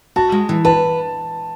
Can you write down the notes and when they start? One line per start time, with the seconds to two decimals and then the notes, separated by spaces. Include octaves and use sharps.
0.16 F#4 A5
0.32 G#3
0.49 E3
0.65 B4 A5